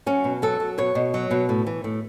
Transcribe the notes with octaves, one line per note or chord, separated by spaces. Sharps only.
F#3 C#4
B2
F#3 A4
F#3
B2 C#5
B2
F#3
B2
A2
E3
A2